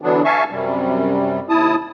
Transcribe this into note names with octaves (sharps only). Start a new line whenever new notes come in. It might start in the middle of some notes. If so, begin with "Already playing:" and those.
D3 E3 F#3 B3 D4
E5 F5 G#5 A5 C#6
F#2 C3 G3
D#2 E4 A5 D#6